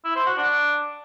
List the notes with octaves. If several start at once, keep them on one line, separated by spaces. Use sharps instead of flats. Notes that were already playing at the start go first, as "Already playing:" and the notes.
E4
C5
F#4
D4